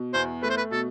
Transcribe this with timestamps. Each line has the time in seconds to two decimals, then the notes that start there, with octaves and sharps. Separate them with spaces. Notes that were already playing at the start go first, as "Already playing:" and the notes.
Already playing: B2
0.14 E2 C5
0.43 A3 B4
0.50 C5
0.58 B4
0.71 B2 A4